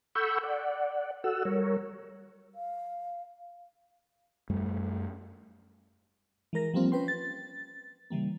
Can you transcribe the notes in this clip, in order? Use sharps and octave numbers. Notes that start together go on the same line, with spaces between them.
A4 F#5 B5 C#6 E6 G6
D5 F#5
F#4 A4 F#5 E6
G3 A#4 C#5
F5
F#2 G3 A3
E3 G#3 A#4 A#6
F3 G3 A#3 C4 F4
C#4 B4 G5 C6
A6
C#3 E3 G3 A#3